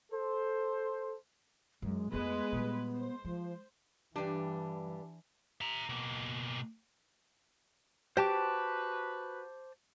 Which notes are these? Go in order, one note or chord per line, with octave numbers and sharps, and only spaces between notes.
A4 C5
F#2 G#3
F2 G#3 A3 B3 B4
A#2 G3
C5
F3 G#3
G2 E3 G3 D4
E5 A#5
B2 A#3
F#4 G4 B4 C5 A5 D6